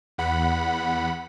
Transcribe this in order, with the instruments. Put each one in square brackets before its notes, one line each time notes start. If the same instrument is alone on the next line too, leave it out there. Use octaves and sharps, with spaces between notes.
[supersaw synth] E2 F#5 B5